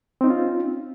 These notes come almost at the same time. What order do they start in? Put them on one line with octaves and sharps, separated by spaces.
C4 D#4 C#4 F4